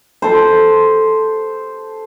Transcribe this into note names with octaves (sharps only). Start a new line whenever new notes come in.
A4 C5